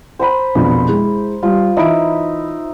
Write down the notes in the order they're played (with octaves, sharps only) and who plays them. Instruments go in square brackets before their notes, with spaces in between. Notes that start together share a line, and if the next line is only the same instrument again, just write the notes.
[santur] C5 A#5 B5
[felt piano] A#1 F2 B2
G#3 E4
[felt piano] G3 [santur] F4
[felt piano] E3 B5 D7 [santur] D#4 E5